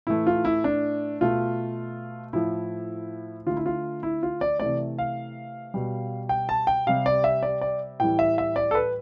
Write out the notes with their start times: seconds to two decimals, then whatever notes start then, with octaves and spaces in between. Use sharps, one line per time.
0.07 A2 E3 A3 E4
0.27 F4
0.45 E4
0.64 D4
1.21 B2 A3 F4
2.33 A2 F3 A3 E4
3.47 D3 A3 F4
3.57 E4
3.66 F4
4.03 E4
4.23 F4
4.41 D5
4.60 C3 E3 A3 D5
4.98 F5
5.74 B2 G3
6.29 G5
6.49 A5
6.67 G5
6.87 C3 G3 F5
7.06 D5
7.24 E5
7.43 D5
7.61 D5
8.00 A2 E3 G3 G5
8.19 E5
8.38 E5
8.56 D5
8.71 A4
8.75 B4